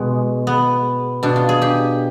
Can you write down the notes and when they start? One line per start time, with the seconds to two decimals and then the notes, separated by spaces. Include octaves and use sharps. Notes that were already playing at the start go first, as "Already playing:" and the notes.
Already playing: B2 G#3
0.47 B3
1.23 B2 D4
1.36 F4
1.49 G#4
1.62 G4